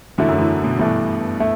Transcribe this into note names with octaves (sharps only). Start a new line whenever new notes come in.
E2 D3 F#3 A3 E4
F#2
E3
B2
G2 B2 E3 A3 D4
A3 E4